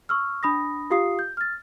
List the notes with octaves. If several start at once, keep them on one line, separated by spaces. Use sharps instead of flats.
C#6 E6 F6
D4 B5 D#6 A#6
F4 G4 F5 D#6 C7
G6
F6 A6